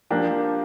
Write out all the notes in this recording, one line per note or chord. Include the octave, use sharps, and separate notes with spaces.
F3 A#3 D4 G4 A#4